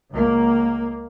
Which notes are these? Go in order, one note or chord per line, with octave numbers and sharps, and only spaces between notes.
C#2 A#3